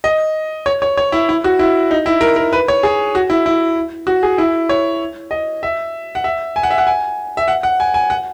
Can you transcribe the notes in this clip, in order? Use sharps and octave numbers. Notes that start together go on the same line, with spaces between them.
D#5
C#5
C#5
C#5
E4
E4
F#4
E4
D#4
E4
A#4
A#4
B4
C#5
G#4
F#4
E4
E4
F#4
G#4
E4
C#5
D#5
E5
F#5
E5
G#5
F#5
E5
F#5
G#5
E5
F#5
F#5
G#5
G#5
F#5